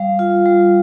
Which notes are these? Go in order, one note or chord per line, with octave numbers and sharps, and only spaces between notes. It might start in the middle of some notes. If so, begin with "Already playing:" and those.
Already playing: G3 F5
F4
G3